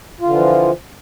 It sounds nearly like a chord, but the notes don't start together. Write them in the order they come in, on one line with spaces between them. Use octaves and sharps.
F4 D3 E3 F3